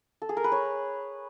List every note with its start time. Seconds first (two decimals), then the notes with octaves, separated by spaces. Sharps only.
0.22 A4
0.29 G#4
0.37 A#4
0.44 B4
0.52 C#5